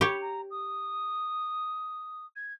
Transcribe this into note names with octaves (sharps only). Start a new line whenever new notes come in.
G4 C#5 B5
A#5
D#6
G#6